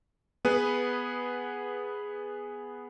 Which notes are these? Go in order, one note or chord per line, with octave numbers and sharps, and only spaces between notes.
B3 G#4 B4